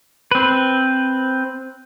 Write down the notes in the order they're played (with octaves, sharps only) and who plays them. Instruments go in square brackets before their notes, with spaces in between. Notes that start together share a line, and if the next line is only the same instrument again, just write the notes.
[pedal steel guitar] C4 B4